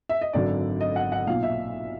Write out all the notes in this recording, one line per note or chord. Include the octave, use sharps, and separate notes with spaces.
E5
D#5
G#1 F#2 D3 D5
D#5
F#5
F#5
B1 A#2 F5
E5